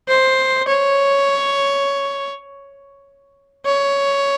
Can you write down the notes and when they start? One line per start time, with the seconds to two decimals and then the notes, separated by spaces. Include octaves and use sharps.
0.08 C5
0.68 C#5
3.66 C#5